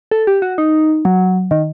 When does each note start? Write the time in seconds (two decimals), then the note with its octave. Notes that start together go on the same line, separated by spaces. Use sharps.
0.11 A4
0.27 G4
0.42 F#4
0.58 D#4
1.05 F#3
1.51 D#3